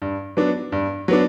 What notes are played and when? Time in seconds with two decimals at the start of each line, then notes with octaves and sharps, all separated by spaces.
0.02 G2
0.37 F#3 B3 D4
0.72 G2
1.08 F#3 B3 D4